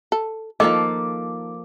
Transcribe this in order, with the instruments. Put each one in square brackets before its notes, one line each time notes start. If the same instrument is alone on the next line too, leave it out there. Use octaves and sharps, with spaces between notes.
[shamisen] A4
[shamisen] D#3 [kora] F3 A#3 A4 [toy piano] D#5 [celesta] D6